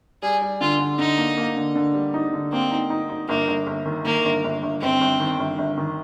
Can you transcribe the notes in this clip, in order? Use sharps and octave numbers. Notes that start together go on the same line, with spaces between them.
G3 G#4
G3
D3 F4
D3
D3 D#4
A#3
A#3
D3
D3
G3
D#4
D3
A#3 C4
D#4
D#4
D#4
G1 A#3
G1
G1
D#3
D#3 A#3
G1
G1
G1
G1 C4
G1
D#3
G1
G1
D#3